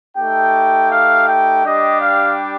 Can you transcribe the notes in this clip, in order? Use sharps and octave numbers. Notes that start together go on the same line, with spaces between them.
A3 D#4 G4 G5
F5
G5
G3 D4 G4 D#5
F5